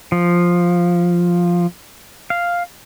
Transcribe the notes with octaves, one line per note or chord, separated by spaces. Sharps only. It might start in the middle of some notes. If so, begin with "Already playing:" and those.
F3
F5